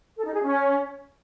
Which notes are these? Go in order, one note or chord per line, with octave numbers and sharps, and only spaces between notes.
A4
D#4
G#4
C#4